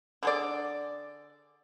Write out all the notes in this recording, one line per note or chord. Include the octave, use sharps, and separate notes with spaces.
D3 G#4 D5